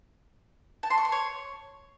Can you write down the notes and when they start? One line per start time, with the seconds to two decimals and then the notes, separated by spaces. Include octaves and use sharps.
0.83 A5
0.90 C6
0.98 C#6
1.05 C6
1.12 C#5